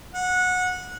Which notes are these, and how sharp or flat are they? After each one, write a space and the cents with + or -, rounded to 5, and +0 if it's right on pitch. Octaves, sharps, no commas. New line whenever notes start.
F#5 -20